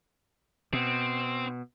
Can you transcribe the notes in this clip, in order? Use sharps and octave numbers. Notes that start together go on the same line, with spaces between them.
B2 C4